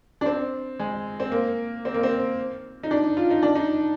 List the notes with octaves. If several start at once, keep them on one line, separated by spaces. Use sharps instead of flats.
D4
C4
G#3
C4
A#3
C4
A#3
C4
D#4
D4
F4
D#4
D4
D#4